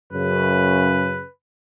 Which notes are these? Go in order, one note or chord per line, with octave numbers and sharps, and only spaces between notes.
F#2 C#3 B4